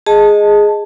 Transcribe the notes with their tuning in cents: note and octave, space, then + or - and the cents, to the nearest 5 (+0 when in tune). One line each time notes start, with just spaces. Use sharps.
G#4 +0 D#5 +0 A5 +0